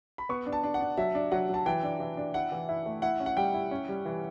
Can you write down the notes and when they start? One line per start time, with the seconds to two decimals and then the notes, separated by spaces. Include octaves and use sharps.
0.18 B5
0.29 B3 C#6
0.46 D4
0.52 A5
0.63 D4
0.74 F#5
0.81 D4
0.97 F#3 E5
1.15 D4
1.32 F#3 F#5
1.49 F#3 A5
1.66 E3 G5
1.83 D4
2.00 E3
2.17 D4
2.34 E4 F#5
2.52 E3
2.69 E4
2.86 A3
3.02 E4 F#5
3.20 C#4
3.26 F#5
3.37 G3 G5
3.54 E4
3.71 C#4
3.89 G3
4.06 E3